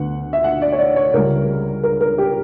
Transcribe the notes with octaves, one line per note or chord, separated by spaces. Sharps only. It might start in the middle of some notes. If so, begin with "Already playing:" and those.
Already playing: D2 D3 B3 F#5
E5
F#5
D5
C#5
D5
C#5
C#2 C#3 G3 A#4
A#4
A#4
G4